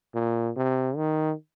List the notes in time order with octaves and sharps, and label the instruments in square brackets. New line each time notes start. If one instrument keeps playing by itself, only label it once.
[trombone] A#2
C3
D#3